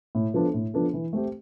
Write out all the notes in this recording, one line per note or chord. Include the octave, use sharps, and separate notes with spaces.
A2
F3 B3 D4 A4
A2
F3 B3 D4 A4
E3
A3 C4 G4